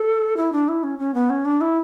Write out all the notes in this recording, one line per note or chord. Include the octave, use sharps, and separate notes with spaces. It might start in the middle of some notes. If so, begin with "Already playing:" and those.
Already playing: A4
E4
D4
E4
C#4
C#4
B3
C#4
D4
E4